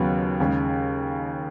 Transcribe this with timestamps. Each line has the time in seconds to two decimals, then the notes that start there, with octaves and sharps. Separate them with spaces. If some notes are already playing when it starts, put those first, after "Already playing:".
Already playing: D#2 C#3 F#3 B3
0.40 D#2 C#3 G#3